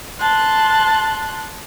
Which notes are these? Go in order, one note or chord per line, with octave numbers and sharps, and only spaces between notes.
A5 C6 F#6